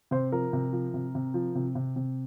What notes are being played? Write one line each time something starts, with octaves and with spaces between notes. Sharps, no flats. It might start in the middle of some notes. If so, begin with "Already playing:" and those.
C3 C5
F3 A#4
C3
F3
C3
C3
F3
C3
C3
C3